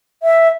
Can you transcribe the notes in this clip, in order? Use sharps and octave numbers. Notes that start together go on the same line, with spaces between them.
E5